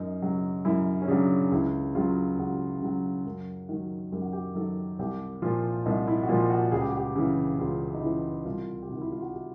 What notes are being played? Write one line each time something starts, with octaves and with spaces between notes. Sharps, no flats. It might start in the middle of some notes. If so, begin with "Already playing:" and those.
Already playing: F#2 D#4
C#3 F#3
F#2 E4
C#4
C#3 F#3 D4
C#2 E4
C#3 F#3 F4
C#2 F#4
C#3 F#3
F#2
D#3 F#3
F#2 G4
F#4
G4
D#3 F#3 A4
C2 G4
A#2 F3 F4
C2 D#4
E4
F#4
A#2 F3 F4
F#4
C#2 G#4
G4
F#4
G4
C#3 E3
C#2 F4
D#4
C#3 E3 E4
C2 F4
G4
C3 D#3 F#4
E4
F4
F#4
G4